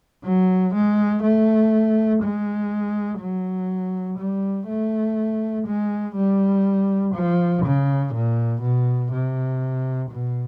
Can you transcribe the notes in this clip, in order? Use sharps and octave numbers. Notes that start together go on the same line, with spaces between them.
F#3
G#3
A3
G#3
F#3
G3
A3
G#3
G3
F3
C#3
A#2
B2
C3
B2